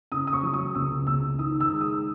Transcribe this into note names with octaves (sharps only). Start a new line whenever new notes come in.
C#3 D#6
D#6
C#6
F#3
D#6
C#2 E6
C#2 E6
D#3 D#6
E6
G#3
D#6